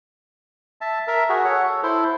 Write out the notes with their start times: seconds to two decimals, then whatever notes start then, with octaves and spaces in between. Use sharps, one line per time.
0.81 E5 A5
1.07 A#4 E5
1.29 F#4 G#4
1.44 A4 C#5 F#5
1.63 A4
1.83 E4 A4 C5